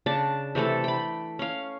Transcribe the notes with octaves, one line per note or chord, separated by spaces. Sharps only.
C#3 D4 A5
C3 E3 A3 A4
G5 B5
C#4 F5